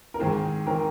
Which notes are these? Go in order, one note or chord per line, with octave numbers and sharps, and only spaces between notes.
A#4
G#2 D#3 C4 G#4
D#3 C4 A#4